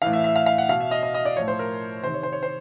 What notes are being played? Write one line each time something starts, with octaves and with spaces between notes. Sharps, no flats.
A2 E3 F5
E5
E5
F5
F5
F#5
B2 F5
E5
D#5
D#5
D#5
D5
A2 F3 C#5
C5
A#4
C3 D#3 C5
C#5
C5
C#5
C5